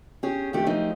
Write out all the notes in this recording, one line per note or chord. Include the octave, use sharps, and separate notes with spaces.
C#4 G4 G#4
F2 D#3 A3 D4 G4
F#2 F3 A3 D#4 G4 C5